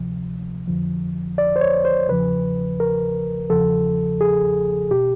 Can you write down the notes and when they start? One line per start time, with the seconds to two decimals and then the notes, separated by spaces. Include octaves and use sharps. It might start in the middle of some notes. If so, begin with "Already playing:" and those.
Already playing: D2 C3 F3
0.67 F2 D3 F3
1.38 D5
1.56 C5
1.61 C#5
1.85 C5
2.09 E2 C#3 F3 B4
2.80 A#4
3.50 E2 C#3 F3 A4
4.21 G#4
4.91 B2 G4